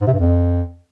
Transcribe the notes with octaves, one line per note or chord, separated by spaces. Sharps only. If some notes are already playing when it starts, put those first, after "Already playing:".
G#2
C3
G2
F2